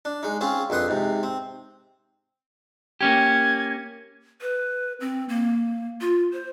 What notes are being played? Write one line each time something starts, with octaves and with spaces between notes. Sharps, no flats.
D4
G#3 D#4
C4 C#4 F4 G#4
A#1 F2 B4 C6 D#6
G#2 C3
C4
A#3 C#4 G4 G#6
B4
C4
A#3
F4
C5